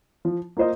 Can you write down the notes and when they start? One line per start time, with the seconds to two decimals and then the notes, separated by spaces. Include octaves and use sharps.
0.25 F3
0.57 A#3 F4 C5 D#5